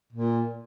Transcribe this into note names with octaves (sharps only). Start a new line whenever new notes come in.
A#2